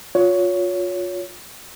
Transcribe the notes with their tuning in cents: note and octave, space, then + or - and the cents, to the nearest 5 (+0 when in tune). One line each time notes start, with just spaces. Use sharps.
F4 +30 C#5 +15